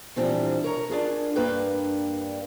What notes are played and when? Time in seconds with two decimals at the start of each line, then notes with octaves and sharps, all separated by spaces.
0.16 A#2 E3 F3 G3 C4 D4
0.64 A#4 C#5 A#5
0.90 D4 F4 G#4 A#4
1.36 G2 A#3 D4 B4 F5 G5